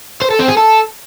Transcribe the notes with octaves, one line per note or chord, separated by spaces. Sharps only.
C5
A4
C4
G#4
A4